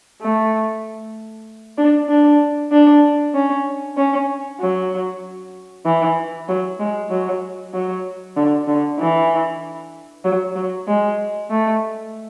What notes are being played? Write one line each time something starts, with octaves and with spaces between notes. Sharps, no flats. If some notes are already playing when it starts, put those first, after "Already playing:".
A3
D4
D4
D4
C#4
C#4
F#3
E3
F#3
G#3
F#3
F#3
D3
D3
E3
F#3
F#3
G#3
A3